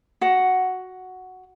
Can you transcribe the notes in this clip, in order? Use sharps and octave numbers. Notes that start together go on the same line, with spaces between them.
F#4 F#5